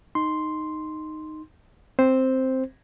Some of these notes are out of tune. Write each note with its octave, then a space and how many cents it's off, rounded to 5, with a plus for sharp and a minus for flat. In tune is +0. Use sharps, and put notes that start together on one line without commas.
D#4 -5 C6 +0
C4 +0 C5 +0